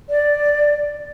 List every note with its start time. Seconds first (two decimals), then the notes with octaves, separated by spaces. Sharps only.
0.09 D5